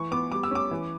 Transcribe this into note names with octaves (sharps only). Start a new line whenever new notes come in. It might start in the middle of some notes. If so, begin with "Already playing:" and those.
Already playing: E3 C#6
B3 D6
G3 D6
E6
C#4 D6
E3